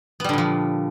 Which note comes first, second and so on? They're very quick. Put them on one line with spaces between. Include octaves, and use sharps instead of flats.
B3 G3 D3 A#2 F3